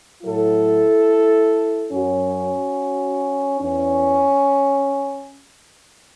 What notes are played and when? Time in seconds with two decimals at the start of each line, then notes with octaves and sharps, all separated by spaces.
0.23 A2 F#3 E4 A4
1.92 F#2 F#3 C#4 F#4
3.61 E2 C#4